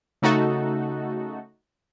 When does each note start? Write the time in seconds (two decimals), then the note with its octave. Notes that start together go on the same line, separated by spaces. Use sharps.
0.22 C#3 A3 D#4 F#4 A4